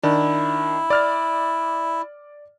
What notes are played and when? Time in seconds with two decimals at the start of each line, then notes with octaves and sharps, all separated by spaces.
0.03 D#3 D4 E4
0.90 D5 F6 A6